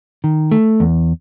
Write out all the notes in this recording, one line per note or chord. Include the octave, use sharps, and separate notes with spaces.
D#3
A3
E2